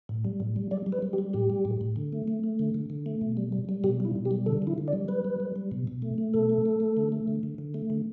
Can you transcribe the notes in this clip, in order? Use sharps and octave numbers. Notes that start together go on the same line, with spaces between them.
A2
G3
A2
G3
G3 D5
G3
B4
G3
G4
G3
A2 G4
G3
A2
A2
D3
A3
A3
A3
D3
D3
D3
A3
B2
G3
G3
G3
B2 G4
G3 E4
B2
G4
G3
D3 A4
D3
E4
D3
D5
G3
G3 B4
G3
G3
G3
B2
B2
A3
A3
B2 A4
A3
A3
A3
D3
A3
D3
D3
D3
A3
D3